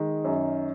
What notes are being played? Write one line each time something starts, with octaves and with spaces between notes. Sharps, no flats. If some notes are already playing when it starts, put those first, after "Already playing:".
Already playing: D#3 G#3
F#2